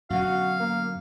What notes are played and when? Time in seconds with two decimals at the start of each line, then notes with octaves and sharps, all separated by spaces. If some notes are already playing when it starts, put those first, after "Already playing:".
0.10 F#2 B2 D3 F#4 F5
0.60 A#3